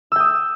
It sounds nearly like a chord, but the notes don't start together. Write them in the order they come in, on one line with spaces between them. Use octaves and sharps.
E6 G5 D#6